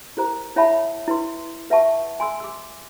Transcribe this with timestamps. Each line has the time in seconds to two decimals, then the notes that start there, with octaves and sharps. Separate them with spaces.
0.17 E4 A#4 C5 A#5
0.56 E4 C#5 E5 F#5 A5 B5
1.08 E4 B4 C6
1.70 B4 E5 F#5 A5 C#6
2.20 G#5 C6 E6
2.40 D6 E6